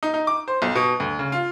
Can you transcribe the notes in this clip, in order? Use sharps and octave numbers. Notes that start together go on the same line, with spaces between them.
D#4
D#4
D6
C5
B1
B2
D2
C#3
F4